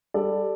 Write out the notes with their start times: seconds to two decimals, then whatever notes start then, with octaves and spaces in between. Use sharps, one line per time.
0.14 G3 A4 D5